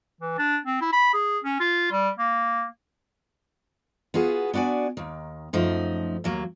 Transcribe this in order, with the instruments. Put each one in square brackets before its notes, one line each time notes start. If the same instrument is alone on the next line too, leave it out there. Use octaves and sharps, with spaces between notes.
[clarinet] E3
D4
C4
E4
B5
G#4
C#4
F4
G3
A#3
[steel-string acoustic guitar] B3 F4 F#4 G#4
B3 D4 F#4 D5 G#5
D#2 D#3
F#2 F3 A3 D#4
D#2 F#3 A#3